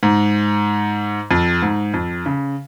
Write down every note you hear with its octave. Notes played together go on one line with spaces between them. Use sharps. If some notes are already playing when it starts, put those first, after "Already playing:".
G#2
F2
G#2
F2
C#3